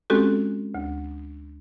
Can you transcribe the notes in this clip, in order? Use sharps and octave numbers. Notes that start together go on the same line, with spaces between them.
G#3 C4 C#4 F#4 G4 A4
D2